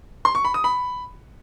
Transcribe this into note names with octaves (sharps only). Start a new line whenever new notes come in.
C6
C#6
B5
D#6
B5